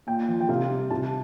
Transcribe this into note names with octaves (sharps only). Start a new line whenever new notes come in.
A#2 G5
F3
G5
C3 F5
G3
C3 A5